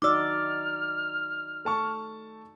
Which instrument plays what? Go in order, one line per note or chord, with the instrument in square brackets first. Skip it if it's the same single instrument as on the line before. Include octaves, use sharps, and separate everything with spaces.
[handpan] D#4 F#4 D5 [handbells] D6 E6 [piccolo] F6
[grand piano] A3 A5 C#6